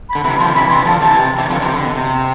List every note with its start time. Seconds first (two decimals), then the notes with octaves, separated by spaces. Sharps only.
0.09 B5
0.15 D3
0.24 C3 E3 B5
0.39 D3 F3 C6
0.55 C3 E3 B5
0.70 C3 E3 C6
0.85 D3 F3 A5
1.01 C3 E3 A5
1.16 C3
1.38 C3 E3
1.50 D3 F3
1.61 C3 E3
1.73 D3
1.85 B2
1.95 C3